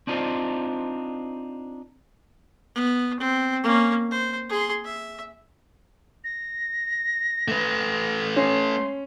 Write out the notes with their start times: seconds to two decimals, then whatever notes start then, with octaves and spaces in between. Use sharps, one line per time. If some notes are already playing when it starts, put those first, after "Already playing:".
0.07 C4 D4 D#4 F4 C5 D5
2.75 B3
3.19 C4
3.63 A#3 C#4
4.11 C5
4.49 G#4 C6
4.85 E5
6.24 A#6
7.48 A3 B4
8.36 C#4 C6